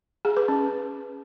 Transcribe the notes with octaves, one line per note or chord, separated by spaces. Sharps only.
G#4
B4
C#4